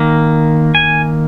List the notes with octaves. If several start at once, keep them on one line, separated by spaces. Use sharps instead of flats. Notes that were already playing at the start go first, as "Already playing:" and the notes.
Already playing: D#3 A#3
G#5